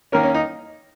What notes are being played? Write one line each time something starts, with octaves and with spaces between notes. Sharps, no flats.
D#3 A#3 C#4 A#4
C#4
D#4